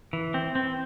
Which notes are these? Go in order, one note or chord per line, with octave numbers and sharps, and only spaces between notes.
E3
C4
C4